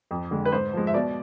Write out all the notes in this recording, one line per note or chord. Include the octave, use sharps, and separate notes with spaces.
F2
D3 G#3
B4
G#2 C5
F3 G#3
E5
B2 D5